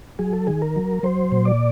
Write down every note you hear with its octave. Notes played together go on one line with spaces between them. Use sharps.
F#3 G#4
A4
D#3 G#4
A#4
F#3
F#3 C5
A#2
D5